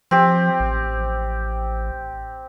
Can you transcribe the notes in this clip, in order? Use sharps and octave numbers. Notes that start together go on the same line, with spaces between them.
F3 C4 G4
A1